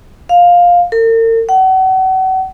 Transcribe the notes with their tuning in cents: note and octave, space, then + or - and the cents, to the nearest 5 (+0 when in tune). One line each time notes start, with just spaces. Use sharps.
F5 +10
A#4 -45
F#5 +35